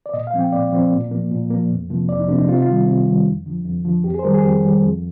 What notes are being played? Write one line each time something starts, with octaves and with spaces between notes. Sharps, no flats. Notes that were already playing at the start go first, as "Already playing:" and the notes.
D5
A#2 D#5
F5
F3 C4
G5
A#2 D5
F3 C4
A#2
F3 A#3
A#2
F3 A#3
F2
C3 F3 A#3
F2 D5
D#4
C3 F3 A#3 D4
D#4
C3 F4
D#4
F4
D#3 G3
C3
D#3 G3
F2
D3 F3
F2
D3 F3
F2 G4
G#4
C5
D#3 G3 A#4
G#4
F2 G4
D#3 G3
F2